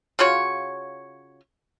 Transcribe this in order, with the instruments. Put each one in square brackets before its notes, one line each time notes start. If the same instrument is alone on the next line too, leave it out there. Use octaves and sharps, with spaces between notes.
[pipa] C#3 F4 F#4 C#5